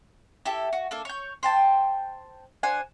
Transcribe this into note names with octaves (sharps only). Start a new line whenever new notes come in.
E4 G4 A4
F#4
A#3 D4 A4
C#5 G6
C5 G5 A5
D4 C5 F#5 G#5